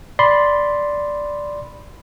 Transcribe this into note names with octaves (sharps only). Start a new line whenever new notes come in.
D5 B5 C6